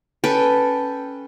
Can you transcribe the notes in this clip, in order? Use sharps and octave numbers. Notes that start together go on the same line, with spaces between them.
C#4 A4 B4 G5